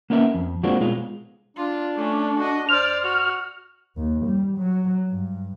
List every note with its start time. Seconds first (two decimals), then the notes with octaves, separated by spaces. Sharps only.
0.10 A#3 B3 C#4 A#4 E5
0.34 F2
0.63 G#3 A#3 C4 D4 F4 F#4
0.80 B2 G#3 F4
1.57 D4 F4
1.96 A3 C#4
2.39 F#4 D#5
2.69 C5 D5 F6
3.04 F#4
3.97 D#2
4.25 G3
4.57 F#3
5.08 G2